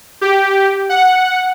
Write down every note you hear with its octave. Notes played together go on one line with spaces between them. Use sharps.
G4
F#5